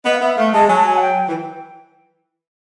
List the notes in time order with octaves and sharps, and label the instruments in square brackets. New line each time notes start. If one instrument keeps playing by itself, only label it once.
[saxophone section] B3 [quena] D#5
[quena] F5
[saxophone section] B3 [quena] E5
[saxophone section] A3 [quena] F5
[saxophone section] G#3 [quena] A5
[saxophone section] F#3 [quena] G#5
[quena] A5
G#5
F#5
G5
[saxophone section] E3